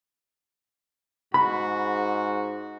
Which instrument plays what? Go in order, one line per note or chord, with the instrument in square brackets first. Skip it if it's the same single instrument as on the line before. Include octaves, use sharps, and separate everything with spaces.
[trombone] G#2 [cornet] F#4 [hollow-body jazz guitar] B5